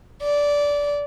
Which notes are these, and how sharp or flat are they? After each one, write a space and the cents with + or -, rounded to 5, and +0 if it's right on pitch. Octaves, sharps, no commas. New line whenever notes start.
D5 -15